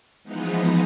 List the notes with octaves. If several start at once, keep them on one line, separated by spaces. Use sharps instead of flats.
E3 F3 G#3 B3 D#4